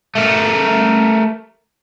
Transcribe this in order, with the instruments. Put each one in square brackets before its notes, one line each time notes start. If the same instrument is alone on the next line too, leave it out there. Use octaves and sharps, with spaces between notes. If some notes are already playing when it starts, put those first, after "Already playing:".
[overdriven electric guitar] A3 A#4